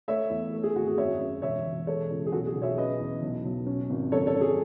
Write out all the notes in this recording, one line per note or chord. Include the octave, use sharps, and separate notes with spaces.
A3 C#5 E5
E2
A3
G#4
G#1 F#4
G#4
F#2 C#5 E5
F#2
E1 C#5 E5
E1
G#3 A4 C#5
C#2
G#4
B1 F#4 A4
G#4
B1
C#5 E5
C#4 B4 D#5
E2
B1
B1
C#4
G#1
F#1 A4 C#5
A4 C#5
F#1
G#4